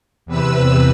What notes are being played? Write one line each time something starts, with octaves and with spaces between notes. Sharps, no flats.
E2 C3 B4 E6